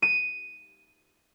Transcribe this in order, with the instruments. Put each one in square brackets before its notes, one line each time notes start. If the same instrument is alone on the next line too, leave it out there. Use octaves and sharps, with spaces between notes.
[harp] D#7